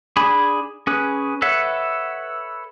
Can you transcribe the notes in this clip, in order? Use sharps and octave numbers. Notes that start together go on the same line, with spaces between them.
D4 G#4 G#5 B5
C#4 G#4 B4
A4 B4 C#5 E5 F#5